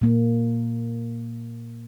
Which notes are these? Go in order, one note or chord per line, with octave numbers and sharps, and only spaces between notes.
A#2 A#3